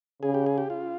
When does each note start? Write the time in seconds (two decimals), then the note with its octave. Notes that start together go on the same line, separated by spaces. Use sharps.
0.23 C#3 G#4
0.34 G4
0.46 G#4
0.58 G4
0.70 F4